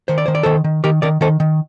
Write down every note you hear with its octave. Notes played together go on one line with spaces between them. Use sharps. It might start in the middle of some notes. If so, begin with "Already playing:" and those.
D#3 C5
D5
D#3 C5
D5
D#3 A4 C5
D#3
D#3 G4 A#4
D#3 A#4 D5
D#3 A4 C5
D#3